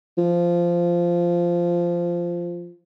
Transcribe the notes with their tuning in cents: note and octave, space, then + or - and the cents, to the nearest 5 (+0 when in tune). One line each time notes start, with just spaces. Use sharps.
F3 -10